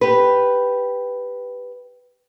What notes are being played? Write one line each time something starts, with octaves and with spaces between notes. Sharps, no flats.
G4 B4